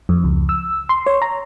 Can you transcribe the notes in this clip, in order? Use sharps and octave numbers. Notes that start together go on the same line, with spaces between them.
F2
C#2
E6
C6
C#5
A#5